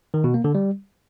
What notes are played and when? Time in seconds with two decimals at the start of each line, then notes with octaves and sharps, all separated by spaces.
0.14 D#3
0.24 B2
0.34 A#3
0.44 D3
0.55 G3